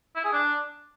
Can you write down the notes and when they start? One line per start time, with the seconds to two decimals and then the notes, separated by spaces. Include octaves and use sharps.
0.16 E4
0.24 G#4
0.33 D4